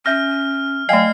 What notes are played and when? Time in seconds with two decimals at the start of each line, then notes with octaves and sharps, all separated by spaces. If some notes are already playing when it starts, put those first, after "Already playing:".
0.06 C#4 E5 F6 G6 A#6
0.89 F#3 A3 D#5 F5 G5 G#5 C7